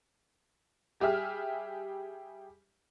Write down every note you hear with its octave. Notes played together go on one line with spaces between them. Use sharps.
G3 G4 G#4 E5 F6